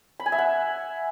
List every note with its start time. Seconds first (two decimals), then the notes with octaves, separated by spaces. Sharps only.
0.20 B5
0.26 G#5
0.32 E5
0.38 F#5